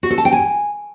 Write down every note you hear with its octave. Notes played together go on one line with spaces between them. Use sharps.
F#4
A4
A5
G5
G#5